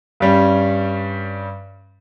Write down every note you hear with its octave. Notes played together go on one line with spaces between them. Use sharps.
G2 G3 C#4